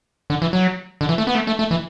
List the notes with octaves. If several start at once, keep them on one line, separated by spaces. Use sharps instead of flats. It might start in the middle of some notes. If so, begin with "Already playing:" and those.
D3
E3
F#3
D3
E3
A3
B3
A3
A3
A3
E3